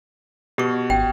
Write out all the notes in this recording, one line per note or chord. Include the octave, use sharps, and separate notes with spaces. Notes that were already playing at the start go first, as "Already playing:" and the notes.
B2 G4 C#6
G#1 G5